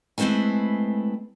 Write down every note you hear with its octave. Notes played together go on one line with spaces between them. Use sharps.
G#3 A3 C4 E4 B4 G#5